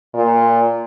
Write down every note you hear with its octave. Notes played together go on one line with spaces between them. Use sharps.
A#2